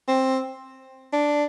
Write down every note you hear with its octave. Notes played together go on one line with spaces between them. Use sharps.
C4
D4